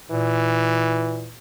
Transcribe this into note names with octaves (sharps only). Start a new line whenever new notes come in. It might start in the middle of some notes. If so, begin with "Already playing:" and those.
A#2 E3